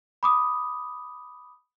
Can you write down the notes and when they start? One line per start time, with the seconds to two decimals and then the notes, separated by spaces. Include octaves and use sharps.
0.23 B5 D6 D#6